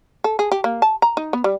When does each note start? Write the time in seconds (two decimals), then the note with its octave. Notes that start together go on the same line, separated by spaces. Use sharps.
0.24 A4
0.39 G#4
0.52 G4
0.64 A#3
0.82 A5
1.02 A#5
1.17 D#4
1.33 B3
1.44 G3